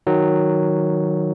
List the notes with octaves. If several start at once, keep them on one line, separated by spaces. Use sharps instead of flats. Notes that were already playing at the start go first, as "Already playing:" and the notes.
D#3 F#3